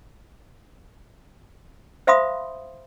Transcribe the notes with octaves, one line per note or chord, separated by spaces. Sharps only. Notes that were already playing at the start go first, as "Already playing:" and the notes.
C5 E5 F5 B5 C6 D#6